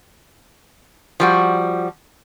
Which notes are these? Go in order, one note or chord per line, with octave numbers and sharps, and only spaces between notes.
F3 G3 F#4